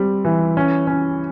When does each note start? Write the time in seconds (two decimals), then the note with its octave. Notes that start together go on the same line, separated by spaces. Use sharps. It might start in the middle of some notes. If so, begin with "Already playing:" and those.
Already playing: G3 C4
0.25 E3
0.57 C#4
0.87 C#4